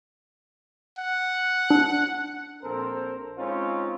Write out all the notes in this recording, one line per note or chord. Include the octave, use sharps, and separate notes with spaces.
F#5
D4
A#1 C4 A4 A#4 C5
G#3 C4 C#4 D#4 F4